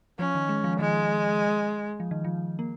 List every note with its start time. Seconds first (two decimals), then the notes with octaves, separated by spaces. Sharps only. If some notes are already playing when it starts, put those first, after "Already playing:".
0.19 F3 C#4
0.35 D#3
0.49 G#3
0.64 F3
0.79 D#3 G#3
2.00 F3
2.11 D#3
2.25 F3
2.59 A#3